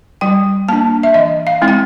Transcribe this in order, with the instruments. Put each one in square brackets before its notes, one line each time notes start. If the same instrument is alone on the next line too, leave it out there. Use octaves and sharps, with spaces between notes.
[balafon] G3 G5
A#3 D4 A5
E5
E3 D#5
F5
G#3 C4 E4
G5